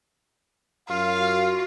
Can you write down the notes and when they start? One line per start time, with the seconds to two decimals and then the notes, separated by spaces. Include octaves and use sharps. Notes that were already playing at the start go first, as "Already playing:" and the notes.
0.89 F#2 F4 F5
1.19 F#4